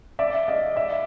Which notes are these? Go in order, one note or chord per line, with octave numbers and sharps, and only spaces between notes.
D5 E5
D#5 F5
D5 E5